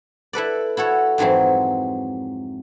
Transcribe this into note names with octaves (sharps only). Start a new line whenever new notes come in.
E4 A4 B4 D5
E4 F#4 A4 C#5
F2 G#2 E3 F#3 C4